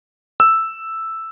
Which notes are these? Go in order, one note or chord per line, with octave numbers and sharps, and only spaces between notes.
E6